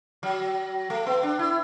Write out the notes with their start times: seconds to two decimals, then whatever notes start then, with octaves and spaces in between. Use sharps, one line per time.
0.23 F#3
0.90 A3
1.07 B3
1.23 D4
1.39 E4